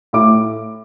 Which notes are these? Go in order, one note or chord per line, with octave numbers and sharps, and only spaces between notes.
A2 D6